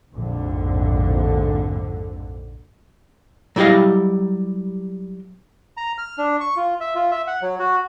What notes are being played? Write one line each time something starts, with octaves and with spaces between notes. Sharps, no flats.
A#1 F2 G#2 D3
F#3 G3 E4 G4 D#5 F5
A#5
F6
D4
C#6
F4
E5
F4
E5
F#5
F#3
F#4